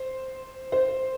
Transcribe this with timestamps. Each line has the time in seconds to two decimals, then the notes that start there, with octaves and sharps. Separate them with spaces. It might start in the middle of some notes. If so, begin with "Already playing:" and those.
Already playing: C5
0.72 C5